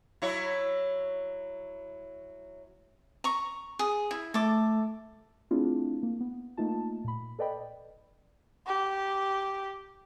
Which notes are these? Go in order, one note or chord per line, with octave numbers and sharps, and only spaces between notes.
F#3 E4 C#5
A#5 C#6
G#4
E4
A3 A4 D6
A3 C4 D4 E4 F4 G#4
A#3
B3
A3 A#3 D#4 F4 A5
A#2 B5
A4 B4 D5 D#5 G5 B5
G4